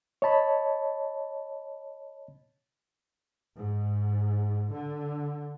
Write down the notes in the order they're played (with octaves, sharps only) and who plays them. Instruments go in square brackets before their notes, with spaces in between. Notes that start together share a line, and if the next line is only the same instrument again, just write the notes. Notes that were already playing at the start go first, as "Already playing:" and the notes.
[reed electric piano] C#5 D#5 A5 B5
[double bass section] G#2
D3